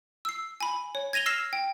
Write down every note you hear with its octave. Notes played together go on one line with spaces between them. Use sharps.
E6 C7
G#5 B5
C#5
G#6 A#6 D#7 F7 G7
E6 F6 A#6 C7 E7
G5